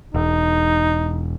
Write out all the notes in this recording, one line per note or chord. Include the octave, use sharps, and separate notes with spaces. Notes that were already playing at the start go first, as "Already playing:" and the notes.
E1 D#4